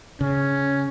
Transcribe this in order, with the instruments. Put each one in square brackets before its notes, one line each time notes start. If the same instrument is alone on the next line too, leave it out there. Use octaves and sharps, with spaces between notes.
[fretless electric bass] C#3 [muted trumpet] C#4